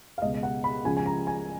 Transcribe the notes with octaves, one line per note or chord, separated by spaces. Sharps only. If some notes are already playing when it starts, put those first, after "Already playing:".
F5
C#2 B2 D#5
F#5
B5
C#2 C#3 F3 G#5
G#5
A#5
G#5